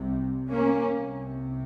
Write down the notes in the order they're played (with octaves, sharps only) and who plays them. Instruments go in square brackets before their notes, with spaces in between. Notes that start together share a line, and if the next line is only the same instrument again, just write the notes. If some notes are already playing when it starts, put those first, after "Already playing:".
Already playing: [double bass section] C2 C3
A#3 C#4
C2 C3